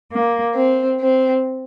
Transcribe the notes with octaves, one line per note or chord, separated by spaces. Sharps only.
A#3
C4
C4